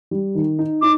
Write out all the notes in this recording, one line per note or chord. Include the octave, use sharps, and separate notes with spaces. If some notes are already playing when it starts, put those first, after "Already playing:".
G3
D#3
D#4
D#4 D6